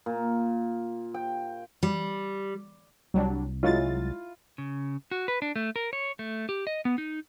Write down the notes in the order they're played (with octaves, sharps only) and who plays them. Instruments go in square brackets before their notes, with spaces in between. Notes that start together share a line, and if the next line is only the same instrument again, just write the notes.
[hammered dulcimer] A#2
G5
[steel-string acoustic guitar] G3
[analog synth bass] C2 [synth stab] F#3 G3 D4
[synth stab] F#3 G#3 A6 [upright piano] E4 F4
[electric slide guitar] C#3
F#4
B4
D4
A3
A#4
C#5
A3
G4
D#5
B3
D#4